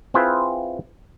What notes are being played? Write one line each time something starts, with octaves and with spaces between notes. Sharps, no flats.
C4 E4 F4 G#4 B4 C5